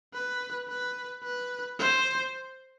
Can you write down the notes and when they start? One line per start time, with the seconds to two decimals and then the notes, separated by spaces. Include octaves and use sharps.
0.14 B4
0.69 B4
1.23 B4
1.79 C5